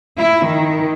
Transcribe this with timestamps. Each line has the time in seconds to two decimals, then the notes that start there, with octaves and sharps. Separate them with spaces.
0.17 E4
0.48 D#3